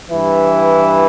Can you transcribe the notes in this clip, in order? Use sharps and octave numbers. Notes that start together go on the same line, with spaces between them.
G2 E3 E4